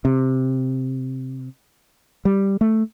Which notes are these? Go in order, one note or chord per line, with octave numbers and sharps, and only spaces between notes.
C3
G3
A3